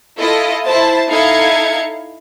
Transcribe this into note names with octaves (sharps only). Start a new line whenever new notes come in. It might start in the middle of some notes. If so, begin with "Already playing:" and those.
E4 F4 A4 D#5
E4 C5 A5
D#4 E4 A4 F5 G#6 C#7